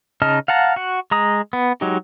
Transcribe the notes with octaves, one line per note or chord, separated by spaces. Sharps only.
C#3 D#4 D#5 A5 F6
F5 F#5 A5 A#5
F#4 F#5
G#3 A#5 D#6
B3
F#3 G#3 D#4 G4